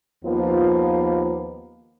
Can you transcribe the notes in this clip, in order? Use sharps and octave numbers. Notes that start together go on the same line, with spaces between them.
D#2 F3 A#3 B3 F4